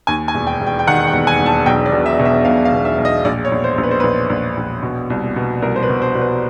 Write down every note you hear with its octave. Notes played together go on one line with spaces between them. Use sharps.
D#2 G#5
G#5
E1
G5
E1
G5
G5
D#3 F#5
G5
E1
G#5
E1
A5
B1 G5
D5
B2
E5
B2
E5
B1 F5
F5
B2
E5
B1
D#5
A#1 D5
C#5
A#1
C5
A#1
B4
C5
A#1 B4
A#1
A#1
B2
C2
B2
C2 A#4
C5
B4
B2
C5
B2
B4